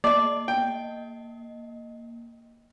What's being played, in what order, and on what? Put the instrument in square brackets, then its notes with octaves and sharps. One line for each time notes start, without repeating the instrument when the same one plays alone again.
[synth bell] A#3 D#5 [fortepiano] D5
[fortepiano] G5